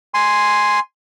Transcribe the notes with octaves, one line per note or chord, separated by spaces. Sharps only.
G#5 C6